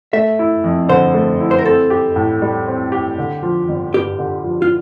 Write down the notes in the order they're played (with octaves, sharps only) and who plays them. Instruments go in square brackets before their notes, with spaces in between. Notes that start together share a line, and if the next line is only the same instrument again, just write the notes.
[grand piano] A3 [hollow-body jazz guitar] E5
[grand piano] E4
F2
[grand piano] D3 [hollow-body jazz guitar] C5
[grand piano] A3
E4
[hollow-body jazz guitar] C5
A#4
[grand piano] C4 [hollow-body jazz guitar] A4
[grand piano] G4
A2
G3
C4
G4
D3
F3
G1
[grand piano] G2 [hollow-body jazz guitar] G4
[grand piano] D3
F3
[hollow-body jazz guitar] F4